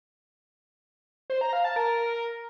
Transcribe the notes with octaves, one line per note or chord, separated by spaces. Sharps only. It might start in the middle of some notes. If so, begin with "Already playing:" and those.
C5
A#5
F5
A5
A#4